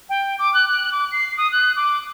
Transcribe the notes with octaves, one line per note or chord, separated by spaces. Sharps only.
G5
D6
F#6
F#6
D6
C7
D#6
F#6
D6